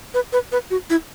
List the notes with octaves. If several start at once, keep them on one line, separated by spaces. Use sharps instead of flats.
B4
B4
B4
F#4
E4